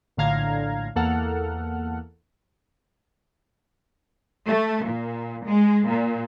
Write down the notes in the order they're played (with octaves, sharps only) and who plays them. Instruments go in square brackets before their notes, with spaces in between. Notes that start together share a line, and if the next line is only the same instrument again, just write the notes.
[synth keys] A#1 A2 D3 F5 A#5 G#6
E2 A#3 A4 F#5 F6
[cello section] A3
A#2
G#3
A#2